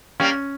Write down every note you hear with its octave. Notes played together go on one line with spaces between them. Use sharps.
G3 A#3 C#4